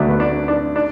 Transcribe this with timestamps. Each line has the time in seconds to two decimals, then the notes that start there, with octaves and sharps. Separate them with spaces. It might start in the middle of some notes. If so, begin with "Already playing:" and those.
Already playing: D2 D3 F#3 A3 D4
0.08 B3
0.20 D4
0.48 D4
0.76 D4